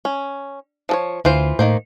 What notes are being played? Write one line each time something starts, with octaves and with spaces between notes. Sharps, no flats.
C#4
F3 A4 C#5
D2 E3 F4 C5
A2 D#3 A#3 C5